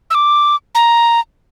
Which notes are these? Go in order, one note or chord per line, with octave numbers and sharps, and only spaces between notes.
E6
D6
A#5